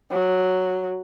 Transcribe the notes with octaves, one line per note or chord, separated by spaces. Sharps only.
F#3